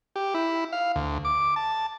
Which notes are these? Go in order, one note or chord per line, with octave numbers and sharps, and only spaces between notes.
G4
E4
F5
D2
D6
A5